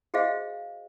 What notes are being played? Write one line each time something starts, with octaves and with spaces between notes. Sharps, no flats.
F#4 G#4 C5 D#5 F5